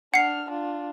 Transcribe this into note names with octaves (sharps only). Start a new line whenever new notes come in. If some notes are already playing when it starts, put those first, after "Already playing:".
D4 F#5 F6 C7
D4 F4